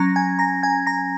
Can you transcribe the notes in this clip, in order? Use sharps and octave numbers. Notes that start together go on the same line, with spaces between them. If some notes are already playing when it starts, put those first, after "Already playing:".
Already playing: F#3 C#4 A#5 A#6
G#5 G#6
A#5 A#6
G#5 G#6
A#5 A#6